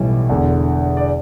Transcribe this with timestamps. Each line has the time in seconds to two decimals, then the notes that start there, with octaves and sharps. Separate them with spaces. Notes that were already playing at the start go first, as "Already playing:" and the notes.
Already playing: B1 A2 E3 G3
0.29 E1 E2 D3
0.97 D5